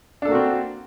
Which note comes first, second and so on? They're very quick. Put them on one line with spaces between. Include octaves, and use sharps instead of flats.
D4 A4 A#3 F#4 C4